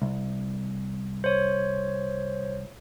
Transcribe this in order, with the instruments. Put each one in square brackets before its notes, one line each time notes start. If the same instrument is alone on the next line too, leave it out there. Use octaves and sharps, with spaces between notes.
[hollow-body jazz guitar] C2
[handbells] C5 C#5